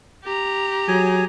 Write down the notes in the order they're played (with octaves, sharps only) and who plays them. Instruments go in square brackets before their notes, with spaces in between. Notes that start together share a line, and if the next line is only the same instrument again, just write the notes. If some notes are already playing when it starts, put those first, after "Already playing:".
[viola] G4 A#5
[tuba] F#3 [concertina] G#4 G#5